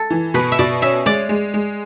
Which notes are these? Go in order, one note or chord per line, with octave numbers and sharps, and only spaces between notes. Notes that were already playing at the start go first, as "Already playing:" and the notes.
Already playing: A4
E3
B2 B4
E5
B2 D5
C#4 E5
G#3 D5
G#3
G#3